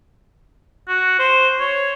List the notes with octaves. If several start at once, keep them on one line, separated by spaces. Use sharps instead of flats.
F#4
C5
C#5